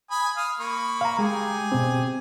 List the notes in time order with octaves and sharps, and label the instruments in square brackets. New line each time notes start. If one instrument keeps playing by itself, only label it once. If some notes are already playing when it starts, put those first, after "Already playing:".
[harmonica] G#5 B5 D#6
F5 D#6
A#3 B5 C#6
[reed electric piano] F5 A#5
[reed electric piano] G#3 [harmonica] G4 G#4 G#5
[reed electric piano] B2 C4